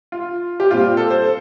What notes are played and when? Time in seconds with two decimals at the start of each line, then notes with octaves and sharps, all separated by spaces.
0.12 F4
0.60 G4
0.71 A#2 G3 C4 F4
0.97 A4
1.10 C5